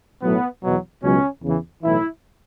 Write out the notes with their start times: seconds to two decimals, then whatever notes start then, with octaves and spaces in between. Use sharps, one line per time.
0.22 B1 A2 F#3 B3
0.62 E2 B2 F#3
1.02 C#2 B2 F#3 C#4
1.42 E2 C#3 E3
1.83 B1 A2 E3 E4